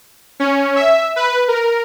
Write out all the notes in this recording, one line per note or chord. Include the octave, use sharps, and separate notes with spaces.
C#4
E5
B4
A#4